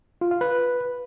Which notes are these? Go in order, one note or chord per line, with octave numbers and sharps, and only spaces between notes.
F4
F5
B4